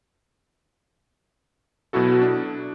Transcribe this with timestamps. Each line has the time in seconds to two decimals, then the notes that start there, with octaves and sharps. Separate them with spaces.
1.93 B2 F#3 E4 F#4 A4
2.22 D4